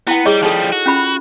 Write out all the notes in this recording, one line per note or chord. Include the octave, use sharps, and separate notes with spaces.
B3 E4 G5
G3 G#4 C#5 D#5
F3 G3 D#4 A4
F#4
C#4 F4 B5